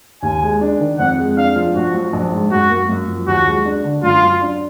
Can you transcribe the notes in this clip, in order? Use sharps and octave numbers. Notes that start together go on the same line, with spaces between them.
D#2 G#5
G#3
D4
D#3
F2 F#5
G#3
D4 F5
F3
A#1 F#4
F#3
A#1
G#2
F#2 F#4
A#3
F#2
F3
D#2 F#4
G#3
D4
D3
F#2 F4
F#3
D4